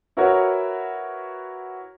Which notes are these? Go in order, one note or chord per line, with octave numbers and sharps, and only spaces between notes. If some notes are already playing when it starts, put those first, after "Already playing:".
E4 F#4 A#4 B4 C#5 F#5